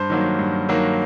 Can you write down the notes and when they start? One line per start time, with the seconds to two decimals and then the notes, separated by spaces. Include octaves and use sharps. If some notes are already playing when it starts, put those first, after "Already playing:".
Already playing: G2 C5
0.10 D#3 F#3 A#3
0.39 G2
0.69 D#3 F#3 A#3